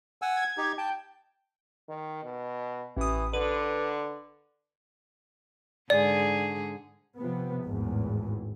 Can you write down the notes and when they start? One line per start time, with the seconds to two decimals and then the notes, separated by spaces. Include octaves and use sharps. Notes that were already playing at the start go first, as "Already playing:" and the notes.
0.22 F#5 G#5 E6
0.37 G#6
0.57 D#4 G4
0.78 G5 A5
1.89 D#3
2.24 B2
2.97 A1 E3 D#6
3.33 D3 B4
5.90 G#2 D3 G#4 D5
7.17 C3 F3 B3
7.65 G#1 E2 A2